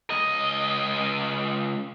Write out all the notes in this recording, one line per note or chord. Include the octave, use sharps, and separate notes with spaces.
C#2 D#5